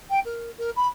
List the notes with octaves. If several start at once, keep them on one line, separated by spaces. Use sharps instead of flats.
G5
A#4
A#4
B5